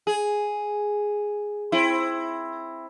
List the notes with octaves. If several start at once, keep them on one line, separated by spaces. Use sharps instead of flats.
G#4
C4 E4